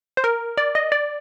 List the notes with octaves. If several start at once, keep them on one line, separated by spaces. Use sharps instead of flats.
C5
A#4
D5
D#5
D5